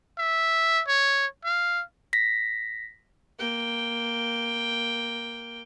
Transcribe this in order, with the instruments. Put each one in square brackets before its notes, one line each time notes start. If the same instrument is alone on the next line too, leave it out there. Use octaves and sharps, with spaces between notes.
[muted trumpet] E5
C#5
F5
[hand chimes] A#6 B6
[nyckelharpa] A#3 G5